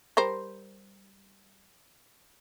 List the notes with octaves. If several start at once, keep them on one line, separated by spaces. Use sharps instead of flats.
G3 A#4 C5